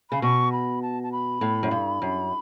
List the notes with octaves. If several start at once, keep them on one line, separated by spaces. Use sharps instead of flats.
C#3 B5
B2 C#6
B5
A5
A5
B5
A2
F#2
G2
F#2